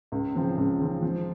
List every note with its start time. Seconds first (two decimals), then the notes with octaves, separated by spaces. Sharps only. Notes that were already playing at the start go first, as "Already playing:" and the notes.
0.12 C#2
0.35 C#3 F3 C4
0.57 C#2
0.80 C#3 F3 C4
1.02 F3